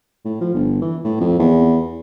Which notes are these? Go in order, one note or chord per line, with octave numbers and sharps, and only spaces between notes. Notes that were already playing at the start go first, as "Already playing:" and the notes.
A2
F3
G1
E3
A2
F2
E2